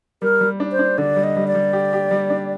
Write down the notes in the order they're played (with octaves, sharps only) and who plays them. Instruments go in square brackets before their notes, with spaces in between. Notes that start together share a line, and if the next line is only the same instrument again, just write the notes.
[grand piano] G3 [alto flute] A#4
[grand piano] G3
D4
[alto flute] C5
[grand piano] D4
[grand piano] D3 [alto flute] D5
[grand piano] G3
[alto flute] D#5
[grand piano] G3
[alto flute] D5
[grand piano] G3
G4
G4
G3
D4